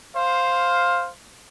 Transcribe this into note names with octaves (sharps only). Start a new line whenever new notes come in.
C5 F5